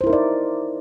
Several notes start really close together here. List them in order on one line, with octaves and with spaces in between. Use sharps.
C5 E4 A#4 D#4 D5